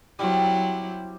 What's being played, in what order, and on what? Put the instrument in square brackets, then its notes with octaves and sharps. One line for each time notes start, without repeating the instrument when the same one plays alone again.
[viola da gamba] F#3 E4 [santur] G3 C4